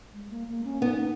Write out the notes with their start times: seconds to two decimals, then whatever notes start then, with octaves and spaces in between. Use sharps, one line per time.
0.14 G#3
0.31 A#3
0.48 A#3
0.64 C#4
0.82 B3 D#4